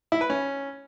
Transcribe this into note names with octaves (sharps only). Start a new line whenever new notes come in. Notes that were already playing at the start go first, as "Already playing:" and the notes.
E4
B4
C#4